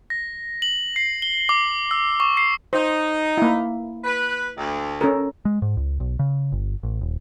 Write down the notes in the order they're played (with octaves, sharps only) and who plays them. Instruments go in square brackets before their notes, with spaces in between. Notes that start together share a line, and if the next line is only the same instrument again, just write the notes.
[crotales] A#6
F#7
C7
G7
D6
E6
C#6
C7
[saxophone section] D#4 [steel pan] C5
[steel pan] A#3 E4
[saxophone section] B4
D2
[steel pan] C#4 A4 A#4
[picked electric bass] G#3
G#2
C#2
B1
C#3
G1
A1
D#1